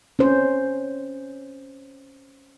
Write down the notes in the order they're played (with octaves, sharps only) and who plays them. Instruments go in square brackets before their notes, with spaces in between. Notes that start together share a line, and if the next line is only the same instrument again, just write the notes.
[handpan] C#4 C5